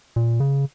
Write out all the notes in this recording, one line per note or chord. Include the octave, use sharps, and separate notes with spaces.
A#2
C#3